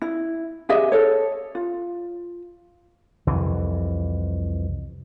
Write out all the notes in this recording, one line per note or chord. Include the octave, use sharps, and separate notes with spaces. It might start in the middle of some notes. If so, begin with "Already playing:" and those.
E4
G4 G#4 D#5 E5
A4 C#5
F4
C2 F2 E3